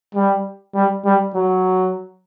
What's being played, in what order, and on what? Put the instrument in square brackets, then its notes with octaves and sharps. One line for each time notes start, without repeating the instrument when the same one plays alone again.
[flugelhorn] G3
G3
G3
F#3